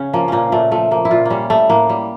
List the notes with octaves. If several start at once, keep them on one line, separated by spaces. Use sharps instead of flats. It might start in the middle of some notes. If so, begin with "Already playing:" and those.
Already playing: C#3 C#4
F3 A#3
A#2 A#3 C#4
A#2 A3
F3 A3
F3 A#3
E4
A#2 F4
G3 A#3 C#4
G3 A3
A2 A#3
G3